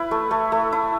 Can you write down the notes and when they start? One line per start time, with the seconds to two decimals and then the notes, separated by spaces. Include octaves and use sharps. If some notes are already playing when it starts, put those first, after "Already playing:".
Already playing: E4 B4
0.11 A3
0.31 A3
0.52 A3
0.72 E4